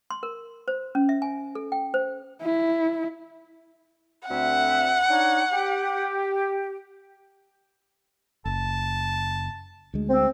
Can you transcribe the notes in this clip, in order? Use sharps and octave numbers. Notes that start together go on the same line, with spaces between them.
C6
A#4
C5
C#4
E5
G#5
A4
G5
C5
E4
D2 C4 E5 F#5
D4 D#4 C#5
G4
F#1 A5
D2 G#3
C4